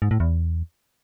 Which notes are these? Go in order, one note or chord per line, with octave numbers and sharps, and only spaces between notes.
G#2
A2
E2